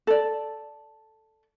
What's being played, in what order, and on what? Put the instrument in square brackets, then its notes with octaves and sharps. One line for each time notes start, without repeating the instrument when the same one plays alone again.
[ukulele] A4 D5